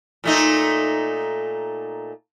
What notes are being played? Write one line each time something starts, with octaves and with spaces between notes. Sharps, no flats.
A#2 A3 D#4